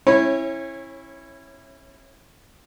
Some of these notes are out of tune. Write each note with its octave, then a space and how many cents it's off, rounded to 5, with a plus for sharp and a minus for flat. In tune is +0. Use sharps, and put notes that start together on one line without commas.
C#4 -35 E4 +0 C#5 -15